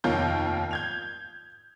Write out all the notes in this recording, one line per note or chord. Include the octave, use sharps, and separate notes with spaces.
F1 D#2 F4 A#4 C#5 G6
G6 G#6 F7